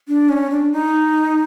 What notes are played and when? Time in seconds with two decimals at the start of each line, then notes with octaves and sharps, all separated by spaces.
0.08 D4
0.29 C#4
0.50 D4
0.72 D#4